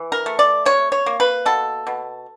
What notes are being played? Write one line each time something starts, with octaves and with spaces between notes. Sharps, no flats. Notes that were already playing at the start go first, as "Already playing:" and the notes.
Already playing: E3
A#4
A3
D5
C3 C#5
C#5
A#3
B4
B2 A4
B2